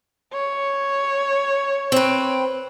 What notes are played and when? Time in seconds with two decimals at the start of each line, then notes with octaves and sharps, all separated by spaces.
0.33 C#5
1.92 C4 B4